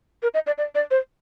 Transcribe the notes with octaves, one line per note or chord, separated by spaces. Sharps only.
A#4
D#5
D5
D5
D5
C5